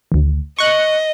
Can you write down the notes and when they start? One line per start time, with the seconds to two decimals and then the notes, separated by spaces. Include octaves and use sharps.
0.12 G#1 D2
0.59 D#5 C#6 F#6